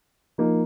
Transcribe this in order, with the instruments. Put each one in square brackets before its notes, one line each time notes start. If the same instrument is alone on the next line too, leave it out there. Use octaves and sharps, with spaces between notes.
[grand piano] F3 A#3 D#4